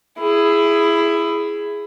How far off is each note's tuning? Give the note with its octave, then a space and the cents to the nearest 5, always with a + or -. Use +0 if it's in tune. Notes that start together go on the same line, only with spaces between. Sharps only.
E4 +15 G#4 +0